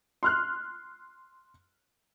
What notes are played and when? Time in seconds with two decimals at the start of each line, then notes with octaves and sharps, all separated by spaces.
0.23 C6 F6 F#6